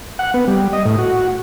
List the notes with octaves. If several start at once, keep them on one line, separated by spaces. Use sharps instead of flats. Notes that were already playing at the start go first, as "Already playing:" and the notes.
F#5
B3
G3
D#5
A2
F#4